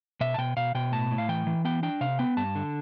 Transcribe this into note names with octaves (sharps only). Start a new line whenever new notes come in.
B2 E5
A5
B2 G5
B2 F5
B2 G5
A2 A5
A2
F5
E3 G5
E3
B3 G5
D4 G5
C3 F5
B3 G5
G2 A5
D3